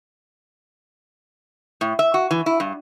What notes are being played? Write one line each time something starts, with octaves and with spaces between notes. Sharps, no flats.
A2
E5
F#4
E3
E4
G2